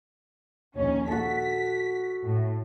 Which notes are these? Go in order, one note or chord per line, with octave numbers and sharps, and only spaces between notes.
A#1 D#2 C#4
F#4 A4 B6
A2